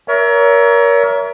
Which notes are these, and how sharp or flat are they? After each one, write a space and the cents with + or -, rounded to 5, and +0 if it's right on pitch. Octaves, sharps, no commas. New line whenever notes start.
A#4 +20 C#5 +35 E5 +0